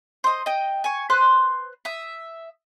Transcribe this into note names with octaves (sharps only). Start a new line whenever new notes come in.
C5 D#5
D#5 G5
G#5 C#6
B4 C5 C6 F#6
E5 D#6